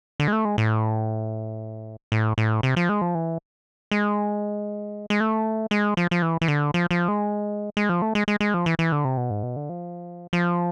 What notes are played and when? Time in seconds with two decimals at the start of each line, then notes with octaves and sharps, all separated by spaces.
0.20 D3
0.28 G#3
0.33 A3
0.45 G#3
0.58 A2
2.12 A2
2.38 A2
2.63 C3
2.76 F3
2.89 G#3
3.02 F3
3.15 E3
3.91 G#3
5.10 G#3
5.20 A3
5.71 G#3
5.97 F3
6.11 F3
6.22 E3
6.41 E3
6.48 D3
6.74 F3
6.91 F3
7.08 G#3
7.77 G#3
7.89 F3
8.02 A3
8.15 G#3
8.28 G#3
8.40 G#3
8.54 F3
8.66 E3
8.79 E3
8.92 D3
9.05 C3
9.17 B2
9.31 G#2
9.43 B2
9.56 D3
9.69 F3
10.33 F3